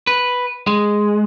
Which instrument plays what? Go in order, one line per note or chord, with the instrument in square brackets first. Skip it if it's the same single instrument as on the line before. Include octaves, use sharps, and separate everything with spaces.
[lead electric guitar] B4
G#3